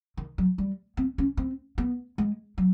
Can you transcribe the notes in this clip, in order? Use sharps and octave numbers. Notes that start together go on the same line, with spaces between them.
D#3
F#3
G3
C4
C#4
C4
B3
G#3
F#3